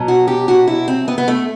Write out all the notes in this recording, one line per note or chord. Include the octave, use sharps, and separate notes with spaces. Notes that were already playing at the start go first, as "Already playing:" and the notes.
Already playing: B2 F#3
F#4
G4
F#4
E4
C4
B3
B3
A3